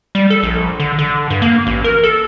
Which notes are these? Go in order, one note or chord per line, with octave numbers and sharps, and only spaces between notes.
G3
A4
A#1
D3
D3
G2
A#3
A1
A#4
A4